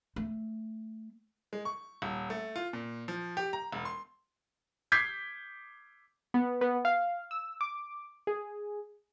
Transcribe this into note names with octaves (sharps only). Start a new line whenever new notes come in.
A3
G#3
C#6
D#1
A3
F4
A#2
F3
G4
A#5
E1
C6
D6 G6 G#6 B6 C7
B3
B3
F5
E6
D6
G#4